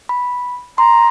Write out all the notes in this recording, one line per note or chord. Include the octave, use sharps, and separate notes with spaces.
B5
A#5 C6